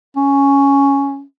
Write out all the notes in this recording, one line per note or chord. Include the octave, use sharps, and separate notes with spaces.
C#4